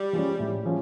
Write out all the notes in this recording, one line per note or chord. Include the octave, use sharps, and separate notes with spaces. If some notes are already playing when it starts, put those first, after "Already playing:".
Already playing: G3
F3 G#3 C#4
A2
F3 G#3 C#4